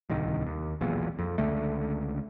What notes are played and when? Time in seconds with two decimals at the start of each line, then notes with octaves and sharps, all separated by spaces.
0.09 D1 C2 D#3
0.46 D#2
0.81 E1 B1 E2 A#2
1.19 F2
1.38 C#2 D3 A3